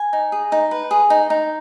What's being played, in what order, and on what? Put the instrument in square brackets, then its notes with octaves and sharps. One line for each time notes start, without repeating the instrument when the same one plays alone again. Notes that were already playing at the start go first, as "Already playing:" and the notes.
Already playing: [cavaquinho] G#5
D#4
G#4
D#4
B4
G#4
D#4
D#4